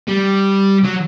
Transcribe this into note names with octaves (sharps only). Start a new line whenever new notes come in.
G3
F#3